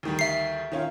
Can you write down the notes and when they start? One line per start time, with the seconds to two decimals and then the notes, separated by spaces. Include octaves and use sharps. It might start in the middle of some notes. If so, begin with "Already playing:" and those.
0.03 D2 D#3 G3
0.19 E5 C7
0.72 D#3 C#4 F4